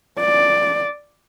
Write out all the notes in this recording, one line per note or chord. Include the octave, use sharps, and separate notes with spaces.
D5